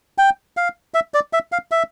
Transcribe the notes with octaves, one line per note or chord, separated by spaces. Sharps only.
G5
F5
E5
D5
E5
F5
E5